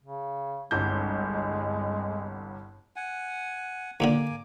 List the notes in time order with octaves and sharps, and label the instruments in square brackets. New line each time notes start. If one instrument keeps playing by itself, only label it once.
[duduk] C#3
[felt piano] G1 C2 G6 [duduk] G#3
[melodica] F#5 G#5
[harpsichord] D#2 A#2 D3 [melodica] A#3 G#5 D6